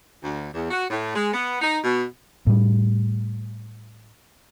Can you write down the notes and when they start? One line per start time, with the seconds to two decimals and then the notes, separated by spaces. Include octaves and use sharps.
0.24 D2
0.54 E2
0.70 F#4
0.90 A2
1.15 G#3
1.33 B3
1.61 D#4
1.84 B2
2.47 A2 G3